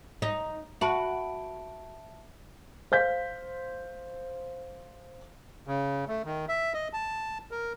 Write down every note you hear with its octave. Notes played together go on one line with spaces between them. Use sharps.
D#4
F#4 B4 E5 A5 D7
C5 F5 G6 B6
C#3
A3
D#3
E5
D#5
A5
A#4